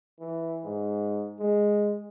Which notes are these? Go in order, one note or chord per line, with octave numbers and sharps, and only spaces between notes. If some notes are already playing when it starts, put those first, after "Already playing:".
E3
G#2
G#3